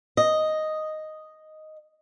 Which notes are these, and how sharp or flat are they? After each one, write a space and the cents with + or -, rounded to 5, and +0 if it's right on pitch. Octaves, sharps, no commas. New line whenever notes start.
D#5 +0